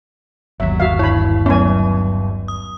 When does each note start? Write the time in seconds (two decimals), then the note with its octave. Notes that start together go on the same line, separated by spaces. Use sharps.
0.60 G1 D#2 F#3 E5
0.80 F#4 E5 F5
0.99 G2 E4 C#5 B5
1.46 F#3 A3 B3 C#4 G#5
2.48 D#6